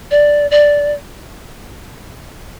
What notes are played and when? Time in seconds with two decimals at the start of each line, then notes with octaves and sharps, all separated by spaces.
0.11 D5
0.51 D5